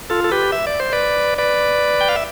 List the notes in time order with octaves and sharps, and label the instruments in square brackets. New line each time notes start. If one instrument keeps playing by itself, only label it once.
[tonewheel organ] F4 A4
A4
G4 B4
E5
D5
C5
B4 D5
B4 D5
G5
F5
E5